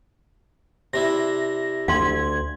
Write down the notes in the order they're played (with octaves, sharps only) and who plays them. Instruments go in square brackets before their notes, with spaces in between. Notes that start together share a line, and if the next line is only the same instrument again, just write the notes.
[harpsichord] C3 D4 E4 [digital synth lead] A#6
[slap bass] D2 [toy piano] F5 C6 [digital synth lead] G#6